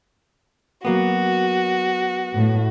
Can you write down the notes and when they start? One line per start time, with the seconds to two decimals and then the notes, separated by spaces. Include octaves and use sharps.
0.85 F#3 A#3 B3 F#4
2.34 A2